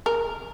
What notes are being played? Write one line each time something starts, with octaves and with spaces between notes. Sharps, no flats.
A#4